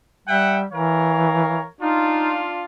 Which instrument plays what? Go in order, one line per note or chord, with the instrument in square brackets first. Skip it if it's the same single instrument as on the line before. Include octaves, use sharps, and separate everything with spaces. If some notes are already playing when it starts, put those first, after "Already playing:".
[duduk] G3 [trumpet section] E5 F#5 G5
[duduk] E3 [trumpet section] A#4 C#5 F5
[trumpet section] D4 F4 [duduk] D#4